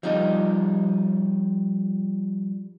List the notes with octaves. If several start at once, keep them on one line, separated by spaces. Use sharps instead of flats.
F3 G3 D#4 G4